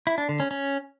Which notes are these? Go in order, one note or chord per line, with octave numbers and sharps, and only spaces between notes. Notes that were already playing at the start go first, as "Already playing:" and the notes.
E4
D4
D3
C#4
C#4